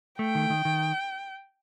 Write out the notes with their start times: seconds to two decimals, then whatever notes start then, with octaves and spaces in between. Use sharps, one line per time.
0.19 A3 G5
0.35 D#3
0.50 D#3
0.65 D#3